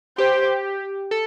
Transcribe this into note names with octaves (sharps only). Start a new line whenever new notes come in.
G4 C5
A4